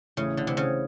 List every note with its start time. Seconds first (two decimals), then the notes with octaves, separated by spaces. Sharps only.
0.17 A1 A2 C#3 E3
0.37 D3
0.47 C3
0.57 C#3